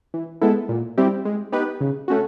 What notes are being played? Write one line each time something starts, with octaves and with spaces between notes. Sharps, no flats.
E3
G#3 B3 E4 A4
A#2
G3 C4 E4 G4
G#3
B3 D#4 G4 B4
C#3
A3 C#4 F#4